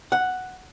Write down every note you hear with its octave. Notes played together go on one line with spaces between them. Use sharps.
F#5